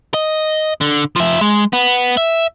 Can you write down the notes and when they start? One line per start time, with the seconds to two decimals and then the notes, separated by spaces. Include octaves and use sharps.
0.14 D#5
0.81 D3
1.16 F3 E5
1.41 G#3
1.73 B3
2.17 E5